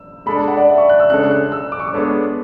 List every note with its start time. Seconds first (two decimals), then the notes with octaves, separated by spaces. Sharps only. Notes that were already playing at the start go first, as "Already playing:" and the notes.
Already playing: E6
0.26 G#3 D4 A4 D5 B5
0.37 A5
0.48 F#5
0.57 D5
0.69 E5
0.78 C#6
0.89 F#6
0.99 E6
1.10 C#3 G#3 D4 A4 C#5 F#6
1.31 F#6
1.52 E6
1.72 D6
1.80 C#6
1.88 D6
1.93 G#3 B3 D4 A4 C#5